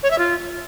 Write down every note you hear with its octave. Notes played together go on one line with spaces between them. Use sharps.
C#5
E5
F4